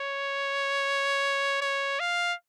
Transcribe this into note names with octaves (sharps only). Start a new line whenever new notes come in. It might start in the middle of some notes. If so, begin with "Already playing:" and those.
Already playing: C#5
C#5
F5